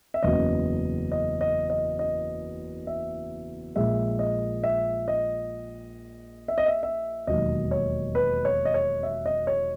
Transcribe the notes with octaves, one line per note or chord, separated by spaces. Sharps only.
E5
F#1 E2 C#3 F#3 D#5
D#5
D#5
D#5
D#5
E5
A#1 A#2 G#3 E5
D#5
E5
D#5
E5
D#5
E5
E5
E1 D#2 D#3 F#3 D#5
C#5
B4
C#5
D#5
C#5
E5
D#5
C#5